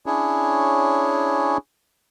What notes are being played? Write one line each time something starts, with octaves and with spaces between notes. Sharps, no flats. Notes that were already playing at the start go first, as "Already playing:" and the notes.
C#4 D4 E4 G#4 C#5